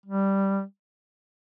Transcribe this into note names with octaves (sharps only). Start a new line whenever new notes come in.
G3